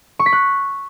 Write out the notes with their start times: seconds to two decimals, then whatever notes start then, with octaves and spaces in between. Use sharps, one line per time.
0.19 C#6
0.26 B6
0.33 F#6